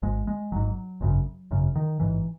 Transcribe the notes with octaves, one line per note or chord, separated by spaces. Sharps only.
G#1 G#2 G#3
G#3
G#1 G#2 F#3
G#1 F#2 C#3
G#1 F#2 C#3
D#3
A1 G#2 E3